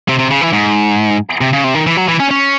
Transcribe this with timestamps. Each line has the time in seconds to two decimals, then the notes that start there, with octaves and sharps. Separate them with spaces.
0.09 C3
0.19 C3
0.31 C#3
0.41 E3
0.53 G#2
1.41 C3
1.53 C#3
1.64 C3
1.75 D#3
1.87 E3
1.97 F#3
2.08 E3
2.20 C#4
2.31 C#4